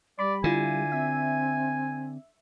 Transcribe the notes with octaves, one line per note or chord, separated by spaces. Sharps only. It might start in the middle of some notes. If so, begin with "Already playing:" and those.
G3 D5 B5
D3 E4 F4 G#5
C4 E5